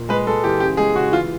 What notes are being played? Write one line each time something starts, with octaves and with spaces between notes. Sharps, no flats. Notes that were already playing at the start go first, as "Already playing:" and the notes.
Already playing: A#2
G#3 B4
G#3 A4
E3 G4
C#3 G4
G#3 G#4
C#3 F#4
E3 F4